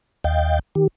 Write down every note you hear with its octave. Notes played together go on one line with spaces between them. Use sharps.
D#2 D#5 F5 G5 G6 A6
D#3 G4